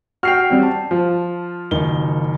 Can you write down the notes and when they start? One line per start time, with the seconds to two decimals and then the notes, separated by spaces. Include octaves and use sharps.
0.23 F#4 G5 F6 C7 F7
0.50 G3 C4 C#4
0.63 A5
0.91 F3
1.71 F#1 D#3 G7